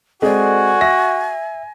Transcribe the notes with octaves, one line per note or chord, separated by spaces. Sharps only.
G#3 C4 F#4 G#4 A4 D5 G#5
E5 A#6